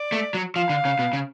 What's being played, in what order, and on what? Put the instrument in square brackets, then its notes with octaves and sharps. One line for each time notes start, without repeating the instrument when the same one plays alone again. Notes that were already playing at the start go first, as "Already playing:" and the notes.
Already playing: [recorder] D5
[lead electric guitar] A3
F#3
[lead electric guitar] F3 [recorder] F5
[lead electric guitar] D3
C#3
B2
C#3